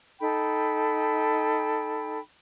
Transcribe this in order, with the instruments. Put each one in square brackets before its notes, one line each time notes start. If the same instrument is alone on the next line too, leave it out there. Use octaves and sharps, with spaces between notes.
[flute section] D#4 A4 G5 B5